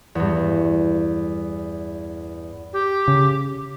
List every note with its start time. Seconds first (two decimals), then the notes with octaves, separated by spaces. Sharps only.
0.15 E2 G2
2.73 G4
3.08 C#3